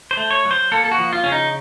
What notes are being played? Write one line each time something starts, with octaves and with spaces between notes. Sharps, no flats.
C5
A3
C#5
F#3
C5
A#3 A4
A4
F#4
F3
F4
C#3 C#4
D#4